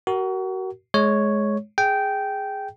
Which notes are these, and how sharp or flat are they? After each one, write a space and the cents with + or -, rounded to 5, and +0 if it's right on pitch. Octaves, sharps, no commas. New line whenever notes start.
F#4 +30 A#4 +0
G#3 +20 C#5 +0
G#4 +0 G5 -10